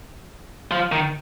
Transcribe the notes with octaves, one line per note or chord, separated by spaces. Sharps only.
F3
D#3